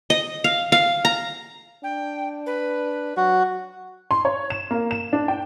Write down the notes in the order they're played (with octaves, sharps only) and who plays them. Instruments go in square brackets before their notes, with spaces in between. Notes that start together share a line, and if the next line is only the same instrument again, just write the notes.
[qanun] D#5
F5
F5
A#5
[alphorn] D4 [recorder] G5
[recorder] B4
[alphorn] F#3 [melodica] F#4
[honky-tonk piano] C6
C#5
E7
A#3
E7
D4
G5